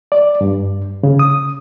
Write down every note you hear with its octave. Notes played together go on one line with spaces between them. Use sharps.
D5
G2
C#3
D#6